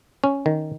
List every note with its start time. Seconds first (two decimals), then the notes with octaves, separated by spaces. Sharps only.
0.24 C#4
0.46 D#3